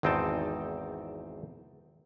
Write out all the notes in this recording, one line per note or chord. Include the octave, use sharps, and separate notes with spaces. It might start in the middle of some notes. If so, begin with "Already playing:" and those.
G#1 E2 C4 D#4 G5 A5